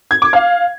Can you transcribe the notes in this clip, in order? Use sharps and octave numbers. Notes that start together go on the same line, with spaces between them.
G#6
D6
F5